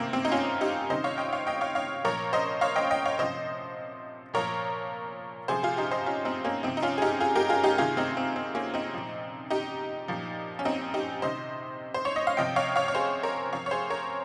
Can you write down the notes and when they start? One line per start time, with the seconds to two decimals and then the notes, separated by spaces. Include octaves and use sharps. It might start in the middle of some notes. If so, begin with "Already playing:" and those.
Already playing: C3 D#3 A#3 C4
0.13 C4
0.25 D#4
0.32 C#4 F4
0.61 D#4 G4
0.90 C3 D#3 C5 D#5
1.04 C#5 F5
1.18 D#5 G5
1.33 C#5 F5
1.47 D#5 G5
1.61 C#5 F5
1.75 C#5 F5
2.05 A#2 F3 A#4 C#5
2.33 C5 D#5
2.61 C#5 F5
2.76 D#5 G5
2.91 D#5 G5
3.05 C#5 F5
3.19 C3 F3 C5 D#5
4.34 A#2 F3 A#4 C#5
5.48 C3 F3 G#4 C5
5.63 F4 G#4
5.77 D#4 G4
5.91 C5 D#5
6.06 C#4 F4
6.25 C4 D#4
6.44 A#3 C#4
6.63 C3 F3 C4 D#4
6.77 D#4
6.82 C#4 F4
6.98 G#4
7.02 D#4 G4
7.20 F4 G#4
7.35 G4 A#4
7.49 F4 G#4
7.63 D#4 G4
7.78 C3 D#3 F4 G#4
7.97 C4 D#4
8.17 C4
8.36 C4
8.55 A#3 C#4
8.74 C4 D#4
8.94 A#2 F3
9.50 D#4 G4
10.08 A#2 F3
10.59 C#4
10.65 C4 D#4
10.94 D#4 G4
11.22 C3 D#3 C5 D#5
11.94 C5
12.05 C#5
12.16 D#5
12.27 F5
12.37 C3 F3 D#5 G5
12.56 C#5 F5
12.76 C#5 F5
12.88 C#5
12.95 G#4 C5
13.23 A#4 C#5
13.53 C3 F3 C#5 F5
13.66 C#5
13.71 G#4 C5
13.90 A#4 C#5